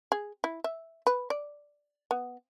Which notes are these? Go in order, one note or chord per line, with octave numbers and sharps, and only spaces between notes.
G#4
E4
E5
B4
D5
B3